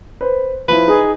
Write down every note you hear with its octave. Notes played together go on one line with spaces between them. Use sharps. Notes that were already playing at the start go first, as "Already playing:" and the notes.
B4 C5
F3 E4 B4
D#4 G#4